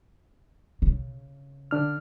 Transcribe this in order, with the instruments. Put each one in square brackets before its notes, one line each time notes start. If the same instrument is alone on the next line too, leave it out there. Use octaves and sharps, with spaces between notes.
[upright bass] C#3
[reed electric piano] D3 D4 F6